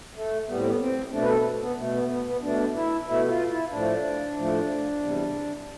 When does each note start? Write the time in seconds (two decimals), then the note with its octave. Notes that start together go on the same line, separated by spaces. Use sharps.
0.15 A3
0.49 A2 G3 B3
0.57 C4
0.66 B3
0.80 C4
1.12 B2 A3 D4
1.22 B4
1.28 A4
1.61 B3
1.77 B2 A3
1.93 B3
2.09 B3
2.26 B3
2.42 B2 A3 D4
2.74 E4
3.06 B2 A3 E4
3.28 F4
3.50 E4
3.71 A2 F3 A3 D4
4.36 A2 F3 A3
5.00 E2 C3 G3